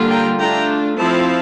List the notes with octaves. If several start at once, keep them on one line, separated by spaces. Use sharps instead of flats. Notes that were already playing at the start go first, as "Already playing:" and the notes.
Already playing: D3 G3 A#3 D4 F4
G5 A#5
A3 D4 F4 G5 A#5
F3 C4 E4 F5 A5